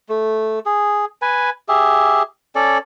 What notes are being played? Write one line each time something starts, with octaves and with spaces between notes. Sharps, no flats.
A3
G#4
B4 G#5
G4 G#4 E5
C#4 A4 D5